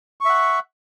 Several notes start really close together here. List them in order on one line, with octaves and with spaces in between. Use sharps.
C#6 E5 F#5